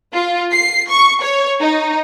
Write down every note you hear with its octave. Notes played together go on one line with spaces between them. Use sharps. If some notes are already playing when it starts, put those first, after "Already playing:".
F4
C7
C#6
C#5
D#4